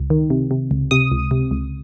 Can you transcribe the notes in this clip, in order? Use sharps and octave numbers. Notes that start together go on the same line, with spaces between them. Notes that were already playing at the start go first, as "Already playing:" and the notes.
Already playing: C#2
D#3
C3
C3
C#2
C3 D#6
C#2
C3
C#2